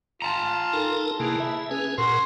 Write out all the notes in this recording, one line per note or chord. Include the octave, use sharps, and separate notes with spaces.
F4 A5 A#5
D#4 A4 A#4
C3 E3 A#3 G#4
E4 E5
C#4 G#4 B4 G#5
A#2 F#4 A#4 C6